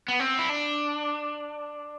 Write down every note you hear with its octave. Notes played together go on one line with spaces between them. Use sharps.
B3
C4
E4
D4